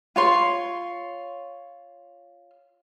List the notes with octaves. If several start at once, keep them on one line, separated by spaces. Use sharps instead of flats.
F4 C#5 C6